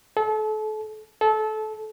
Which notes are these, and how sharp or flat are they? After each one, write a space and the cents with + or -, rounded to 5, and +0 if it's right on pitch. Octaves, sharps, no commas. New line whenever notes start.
A4 -35
A4 -25